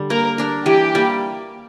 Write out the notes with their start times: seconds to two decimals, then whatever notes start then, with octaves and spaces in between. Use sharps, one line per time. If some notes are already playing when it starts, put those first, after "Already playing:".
Already playing: D3 G3
0.10 A#3 A#4
0.38 D4 A#4
0.66 E3 G4
0.95 G3 A#3